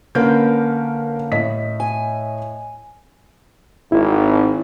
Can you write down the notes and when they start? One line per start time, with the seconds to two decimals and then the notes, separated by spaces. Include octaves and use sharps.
0.15 D3 A#3 C#4 A#4 B4 G6
1.32 A2 D#5 B6
1.80 G#5
3.92 G#1 E4